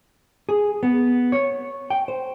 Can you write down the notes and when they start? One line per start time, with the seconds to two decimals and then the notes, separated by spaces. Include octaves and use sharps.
0.49 G#4
0.83 B3
1.32 C#5
1.90 G5
2.08 C5